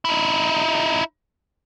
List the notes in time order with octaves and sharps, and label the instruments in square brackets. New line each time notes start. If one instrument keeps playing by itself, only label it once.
[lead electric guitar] D#4 E4